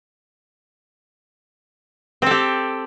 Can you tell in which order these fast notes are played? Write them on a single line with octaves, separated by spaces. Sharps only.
C4 A4 G4